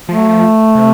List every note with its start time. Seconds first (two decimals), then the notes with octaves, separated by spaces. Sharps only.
0.09 F3 A3
0.17 F#3
0.27 F3
0.75 C3